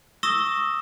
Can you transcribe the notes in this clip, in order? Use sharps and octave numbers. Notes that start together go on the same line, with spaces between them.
C#6 D#6 E6 A#6 E7 G7